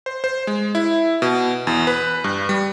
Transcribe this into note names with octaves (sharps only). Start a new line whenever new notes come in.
C5
C5
G#3
E4
B2
E2
B4
G2
G3